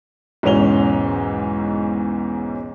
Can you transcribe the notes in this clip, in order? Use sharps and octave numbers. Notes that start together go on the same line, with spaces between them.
B1 E2 G#2 C#4 F7 G7